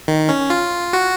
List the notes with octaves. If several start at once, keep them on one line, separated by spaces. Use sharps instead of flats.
D#3
C#4
F4
F#4